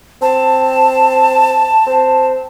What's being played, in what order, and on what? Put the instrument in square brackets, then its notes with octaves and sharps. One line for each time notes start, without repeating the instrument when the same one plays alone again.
[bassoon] C4 [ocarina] A5
[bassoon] C4